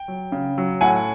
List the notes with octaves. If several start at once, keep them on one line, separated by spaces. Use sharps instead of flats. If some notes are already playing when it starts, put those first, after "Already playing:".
Already playing: G5
F#3
C#3
F#3
A2 F#5 G#5